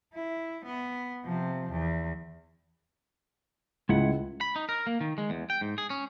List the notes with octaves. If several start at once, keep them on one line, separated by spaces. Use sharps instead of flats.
E4
B3
C3 F3
E2
C#2 G#3 E4 F#5
B5
D#4
A#4
A#3
D#3
G#3
E2
G5
G#2
G#4
C#4